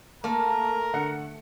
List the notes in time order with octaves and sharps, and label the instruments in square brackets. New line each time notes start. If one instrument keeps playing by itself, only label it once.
[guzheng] A3 [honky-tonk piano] A#3 [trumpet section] A#4
[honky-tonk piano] D3 F#5 C#7